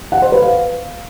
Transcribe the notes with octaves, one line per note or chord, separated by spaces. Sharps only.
F#5
C5
B4
F5